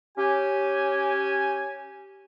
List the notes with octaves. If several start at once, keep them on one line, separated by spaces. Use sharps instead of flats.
C#4 G4 G#5